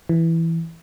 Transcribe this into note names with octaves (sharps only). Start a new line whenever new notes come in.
E3